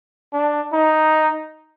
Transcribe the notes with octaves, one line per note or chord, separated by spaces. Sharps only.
D4
D#4